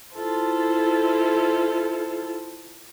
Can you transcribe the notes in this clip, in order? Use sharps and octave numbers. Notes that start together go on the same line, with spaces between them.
E4 F4 A4 C5